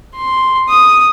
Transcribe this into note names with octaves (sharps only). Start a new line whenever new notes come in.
C6
D#6